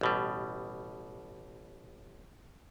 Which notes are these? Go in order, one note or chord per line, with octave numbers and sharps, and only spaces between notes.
A1 B2 G3